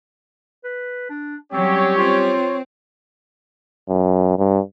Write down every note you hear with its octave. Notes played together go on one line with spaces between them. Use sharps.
B4
D4
F#3 G3 C4 C#4 G4 C#5
C4 F4
F#2
G2